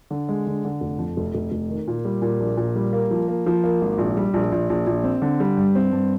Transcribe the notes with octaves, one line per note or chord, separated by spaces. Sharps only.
D3
G#3
D3
D3
F1
F2
F1
F1
F1
D#3
A#2
G3
A#2
A#1
A#2
G3
A#3
F3
A#3
F3
A#3
G#1
A#1
G3
A#1
A#1
A#1
A#1
C4
D3
G3
G2
C4
G2